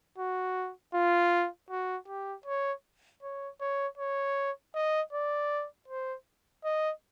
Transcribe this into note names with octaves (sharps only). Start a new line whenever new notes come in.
F#4
F4
F#4
G4
C#5
C#5
C#5
C#5
D#5
D5
C5
D#5